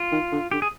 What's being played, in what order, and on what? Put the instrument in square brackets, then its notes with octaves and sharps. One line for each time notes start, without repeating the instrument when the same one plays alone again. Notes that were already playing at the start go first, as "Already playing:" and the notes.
Already playing: [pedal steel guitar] F4
[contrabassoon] D#3
D3
[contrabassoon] D3 [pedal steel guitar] G4
[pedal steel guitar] G#4